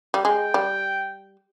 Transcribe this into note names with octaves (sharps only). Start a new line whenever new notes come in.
G3
G#3 G5
G3